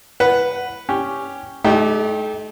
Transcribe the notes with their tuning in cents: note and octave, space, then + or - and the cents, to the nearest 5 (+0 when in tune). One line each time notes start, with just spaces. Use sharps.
B4 +0 F#5 +0
C#4 +0 G4 +0
A3 -40 D#4 +0 G4 +0